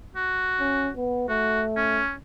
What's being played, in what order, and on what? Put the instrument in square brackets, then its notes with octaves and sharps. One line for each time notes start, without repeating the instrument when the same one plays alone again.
[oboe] F#4
[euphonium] C#4
B3
[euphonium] A3 [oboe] F#4
[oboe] C#4